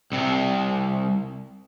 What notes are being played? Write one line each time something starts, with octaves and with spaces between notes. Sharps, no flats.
C2 C3